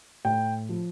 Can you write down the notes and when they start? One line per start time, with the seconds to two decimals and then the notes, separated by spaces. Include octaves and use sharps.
0.25 A2 G5
0.69 F3